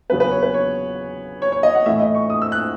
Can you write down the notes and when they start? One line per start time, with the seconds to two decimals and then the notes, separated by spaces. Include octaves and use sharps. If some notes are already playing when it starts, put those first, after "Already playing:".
0.09 E2 C#3 F#3 B3 B4
0.20 B4
0.31 C#5
0.43 B4
0.54 C#5
1.42 C#5
1.52 C#5
1.63 D#5
1.75 F#5
1.86 A2 E3 A3 E5
2.00 D#5
2.15 C#6
2.30 D#6
2.42 E6
2.52 F#6